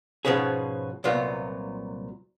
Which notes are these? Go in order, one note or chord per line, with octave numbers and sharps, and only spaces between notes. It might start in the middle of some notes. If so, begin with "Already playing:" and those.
G#2 B2 F3 B3 C#4 G#4
C2 A#2 F#3 B3 F4